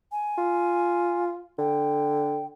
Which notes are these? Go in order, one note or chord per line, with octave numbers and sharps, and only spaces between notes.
G#5
F4
D3 G5